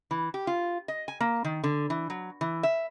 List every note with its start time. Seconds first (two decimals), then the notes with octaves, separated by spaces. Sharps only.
0.11 E3
0.34 G4
0.47 F4
0.88 D#5
1.08 G#5
1.20 A#3
1.45 D#3
1.64 D3
1.90 E3
2.10 F#3
2.41 E3
2.63 E5